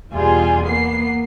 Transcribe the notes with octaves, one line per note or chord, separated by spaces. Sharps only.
E2 B2 G3 F4 G#4
A#3 B3 C7